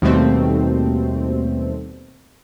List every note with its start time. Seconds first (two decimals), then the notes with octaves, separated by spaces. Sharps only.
0.02 D#2 B2 G3 A3 C4